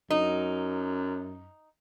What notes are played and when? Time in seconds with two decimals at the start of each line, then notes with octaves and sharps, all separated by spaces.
0.10 F#2 D#4